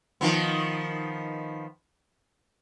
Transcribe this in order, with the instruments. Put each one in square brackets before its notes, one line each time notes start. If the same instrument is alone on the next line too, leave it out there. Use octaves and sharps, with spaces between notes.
[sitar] D#3 F3 B3